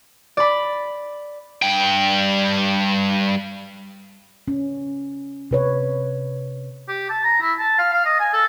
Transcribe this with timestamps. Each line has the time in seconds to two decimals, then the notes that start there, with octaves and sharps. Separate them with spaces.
0.37 D5 B5
1.62 G2 G5
4.48 C#4
5.51 C3 B4 C#5
6.88 G4
7.10 A5
7.24 A#5
7.41 E4
7.59 A5
7.78 F5
7.93 F5
8.05 D#5
8.19 G#5
8.33 A4